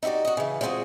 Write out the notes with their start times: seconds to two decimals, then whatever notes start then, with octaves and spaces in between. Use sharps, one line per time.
0.03 D#4 E4 F#4 G4 D5
0.25 F#4 D#5
0.37 C#3 E3
0.61 G3 G#3 C4 F4 F#4 G#4